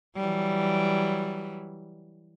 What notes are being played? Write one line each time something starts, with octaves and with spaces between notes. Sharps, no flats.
E3 F#3 G3